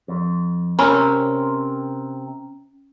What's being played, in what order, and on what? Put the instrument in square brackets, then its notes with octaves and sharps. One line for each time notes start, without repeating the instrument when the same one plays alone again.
[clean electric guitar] F2
[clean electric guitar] C3 C4 A#4 [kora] C#4